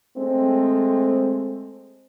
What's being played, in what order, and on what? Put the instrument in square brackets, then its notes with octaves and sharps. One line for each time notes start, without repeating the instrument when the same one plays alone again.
[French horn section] G#3 A3 C4